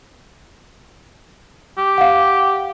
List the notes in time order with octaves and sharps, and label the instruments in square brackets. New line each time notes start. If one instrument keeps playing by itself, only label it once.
[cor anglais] G4
[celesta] F5 F#5